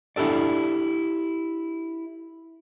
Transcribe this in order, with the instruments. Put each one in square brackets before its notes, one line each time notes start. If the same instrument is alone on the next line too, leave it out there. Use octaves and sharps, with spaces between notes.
[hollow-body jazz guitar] D4 E4 G4 A4 D5